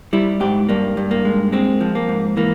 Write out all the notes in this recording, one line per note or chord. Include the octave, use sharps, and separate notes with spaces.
G3 E4
G#2 G4
G2 A#3
G2
A#3
G#3
G#3 C4
F3
A#3
G#2
E3 A#3